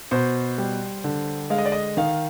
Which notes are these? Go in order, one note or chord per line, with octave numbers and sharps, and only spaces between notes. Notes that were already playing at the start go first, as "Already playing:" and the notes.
B2 C5
G3
D3
G#3 F5
D#5
D5
D#5
D#3 F5